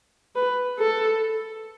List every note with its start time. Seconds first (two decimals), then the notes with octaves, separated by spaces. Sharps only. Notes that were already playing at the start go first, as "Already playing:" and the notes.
0.36 B4
0.78 A4